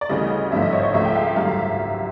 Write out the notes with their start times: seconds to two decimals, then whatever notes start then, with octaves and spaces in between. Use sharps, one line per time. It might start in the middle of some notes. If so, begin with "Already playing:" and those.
0.01 D5
0.09 D2 C#3 E3 G3 D#5
0.52 G#1 G2 D3 F3 E5
0.62 D#5
0.73 C#5
0.79 C5
0.83 C#5
0.94 C#2 C#3 F3 A3 E5
1.05 G5
1.15 F5
1.26 F#5
1.36 G#1 F#2 D3 G3 F5
1.48 E5